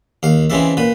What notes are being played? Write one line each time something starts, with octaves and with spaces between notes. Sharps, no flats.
D#2 F5
C#3 E3 G#3 C4 E5
A#2 B4